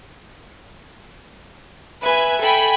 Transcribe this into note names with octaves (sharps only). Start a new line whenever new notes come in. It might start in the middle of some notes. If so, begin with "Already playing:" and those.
B4 E5 G#5
A4 G5 G#5 B5